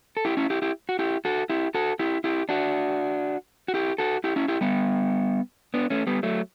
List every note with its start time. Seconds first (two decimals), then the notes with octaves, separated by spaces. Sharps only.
0.17 A4
0.25 E4 G4
0.37 C#4 E4
0.50 E4 G4
0.62 E4 G4
0.89 F#4
0.99 E4 G4
1.25 F#4 A4
1.50 E4 G4
1.75 F#4 A4
1.99 E4 G4
2.24 E4 G4
2.49 D4 F#4
3.68 F#4
3.74 E4 G4
3.98 F#4 A4
4.24 E4 G4
4.36 C#4 E4
4.48 E4 G4
4.61 G3 B3
5.74 B3 D4
5.90 A3 C#4
6.07 G3 B3
6.23 F#3 A3